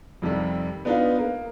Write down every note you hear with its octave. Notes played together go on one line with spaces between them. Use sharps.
F2 C3 D#3 G3
B3 D4 D#4 F4 B4
A#3